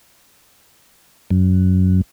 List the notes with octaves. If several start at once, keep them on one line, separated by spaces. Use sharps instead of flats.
F#2